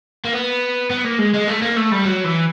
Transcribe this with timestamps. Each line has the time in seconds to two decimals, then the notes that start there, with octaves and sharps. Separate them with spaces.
0.25 A#3
0.33 B3
0.90 B3
1.05 A#3
1.19 G#3
1.34 G#3
1.47 A3
1.62 A#3
1.76 A3
1.92 G3
2.05 F#3
2.25 E3